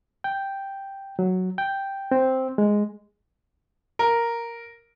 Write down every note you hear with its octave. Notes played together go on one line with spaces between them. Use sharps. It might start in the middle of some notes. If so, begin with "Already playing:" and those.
G5
F#3
G5
C4
G#3
A#4